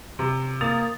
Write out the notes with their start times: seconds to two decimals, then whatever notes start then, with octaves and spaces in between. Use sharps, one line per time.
0.19 C3
0.61 A#3 D#6 A6 F7